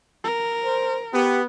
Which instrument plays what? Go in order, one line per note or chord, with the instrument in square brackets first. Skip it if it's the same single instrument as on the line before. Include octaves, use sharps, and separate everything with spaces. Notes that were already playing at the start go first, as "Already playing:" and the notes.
[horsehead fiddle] A#4
[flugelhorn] C5
[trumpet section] B3 [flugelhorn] G4